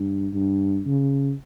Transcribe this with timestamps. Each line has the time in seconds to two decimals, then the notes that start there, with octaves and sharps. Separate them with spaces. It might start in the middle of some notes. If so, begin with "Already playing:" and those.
Already playing: G2
0.34 G2
0.86 C#3